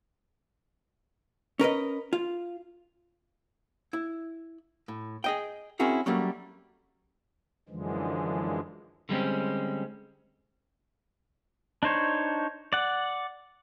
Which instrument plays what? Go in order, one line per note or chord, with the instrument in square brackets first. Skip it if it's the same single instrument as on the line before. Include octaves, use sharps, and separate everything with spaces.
[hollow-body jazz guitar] C#4 A#4 B4 D#5
F4
E4
A2
G#4 D#5 G5
C4 C#4 E4 F#4 G#4 A#4
F#3 G3 A3 A#3 C#4
[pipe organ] F#2 D3 E3 F3 G#3
[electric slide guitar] D3 G3 G#3 C4 C#4
[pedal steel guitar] D4 D#4 C5 C#5
D5 F#5